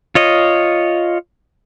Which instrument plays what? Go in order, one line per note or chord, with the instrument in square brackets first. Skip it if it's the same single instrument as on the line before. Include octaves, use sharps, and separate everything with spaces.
[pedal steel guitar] F4 C#5 D#5